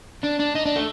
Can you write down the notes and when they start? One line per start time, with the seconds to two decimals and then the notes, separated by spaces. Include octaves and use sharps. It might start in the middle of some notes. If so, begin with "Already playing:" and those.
0.24 D4
0.40 D4
0.55 D#4
0.66 D4
0.76 A3